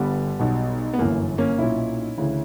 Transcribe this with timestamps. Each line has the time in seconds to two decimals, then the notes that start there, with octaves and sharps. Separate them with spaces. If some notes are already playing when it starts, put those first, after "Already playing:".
Already playing: G1 G2 D3 G3 B3
0.39 B1 B2
0.94 B3
0.99 G1 F#2 E3 A#3
1.38 A#3 C#4
1.58 B1 A#2 C#4 E4
2.18 D2 C#3 E3